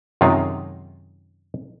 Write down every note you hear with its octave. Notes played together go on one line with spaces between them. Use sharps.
F#2 C3 D#3 G#3 D#4 F4